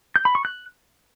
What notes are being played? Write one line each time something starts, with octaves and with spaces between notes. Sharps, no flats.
G6
B5
C#6
F#6